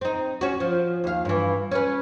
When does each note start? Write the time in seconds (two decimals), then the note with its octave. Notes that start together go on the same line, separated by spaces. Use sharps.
0.01 C4 D#4
0.41 C#4 F#4
0.60 F3
1.04 D#2 F5
1.25 G2 E3
1.71 C#4 B4